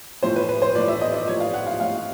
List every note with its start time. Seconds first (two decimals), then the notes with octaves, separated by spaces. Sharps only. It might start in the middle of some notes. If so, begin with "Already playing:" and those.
0.23 A2 F3 C5
0.36 B4
0.49 B4
0.62 C5
0.75 A2 F3 D5
0.88 E5
1.01 D#5
1.14 D5
1.28 A2 F3 C#5
1.40 F5
1.54 F#5
1.67 F5
1.80 A2 F3 F5